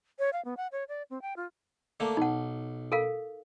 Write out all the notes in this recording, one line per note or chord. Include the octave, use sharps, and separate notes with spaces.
C#5
F5
B3
F#5
C#5
D5
C4
G5
F4
D3 A3 A#3
B1 D#4 F#5
A4 A#4 F5